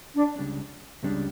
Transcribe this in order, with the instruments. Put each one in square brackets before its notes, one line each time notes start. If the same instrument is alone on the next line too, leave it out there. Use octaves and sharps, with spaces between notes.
[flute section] D4
[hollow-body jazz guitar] C#2 C#3 G3 D4
C#2 C#3 G3 D4